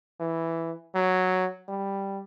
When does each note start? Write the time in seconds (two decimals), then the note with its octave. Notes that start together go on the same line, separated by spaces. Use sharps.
0.20 E3
0.95 F#3
1.68 G3